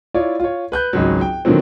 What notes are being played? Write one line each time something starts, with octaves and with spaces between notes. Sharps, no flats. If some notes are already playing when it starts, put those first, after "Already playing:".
E4 F4 C#5 D5
F4 C#5
B4 F#6 G6
G#1 C#2 F#3
G5
B2 D3 D#3 F3 F#3 C4